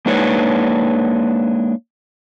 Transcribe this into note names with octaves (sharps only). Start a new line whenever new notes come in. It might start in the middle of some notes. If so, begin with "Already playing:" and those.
G#3 A#3 D4 D#4 B4 C#5